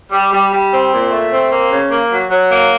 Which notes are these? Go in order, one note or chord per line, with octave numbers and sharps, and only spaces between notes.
G3
G3
G3
C4
A#2
A3
C4
A#3
C#3
A#3
F#3
F#3
A#3